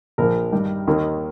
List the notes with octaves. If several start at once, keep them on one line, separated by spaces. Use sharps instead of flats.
A#1 A#2 F3 A#3 A#4
G2 D#3 G3
D#2 D#3 A#3